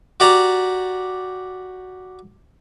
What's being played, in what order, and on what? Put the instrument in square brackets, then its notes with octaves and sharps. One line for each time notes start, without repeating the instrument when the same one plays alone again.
[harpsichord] F#4 G4 D5 A#5